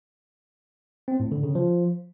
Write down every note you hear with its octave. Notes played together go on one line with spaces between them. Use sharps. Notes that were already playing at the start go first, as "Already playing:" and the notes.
C4
A2
D3
C#3
F3